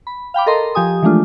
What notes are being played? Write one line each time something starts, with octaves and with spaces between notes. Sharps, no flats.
B5
F5 G5 B5 D6
A4 A#4 D#5 A#5 C6
F3 G4 G#5 D#6
E3 F3 G#3 A3 D4 F4